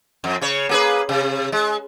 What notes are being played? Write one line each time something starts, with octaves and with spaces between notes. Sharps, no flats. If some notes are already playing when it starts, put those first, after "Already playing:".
F2
C#3 C#5
A#3 G#4 B4
C3
G#3